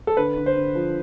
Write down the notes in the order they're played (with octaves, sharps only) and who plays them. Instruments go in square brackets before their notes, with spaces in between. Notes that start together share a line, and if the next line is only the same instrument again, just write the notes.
[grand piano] A4
[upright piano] D3 [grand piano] B4
[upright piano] D3
[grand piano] C5
[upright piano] D3
F3